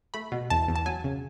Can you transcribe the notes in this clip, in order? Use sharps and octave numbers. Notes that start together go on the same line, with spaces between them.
A3 B5
B2
E2 A5
E2
A5
F#3 G#5
C#3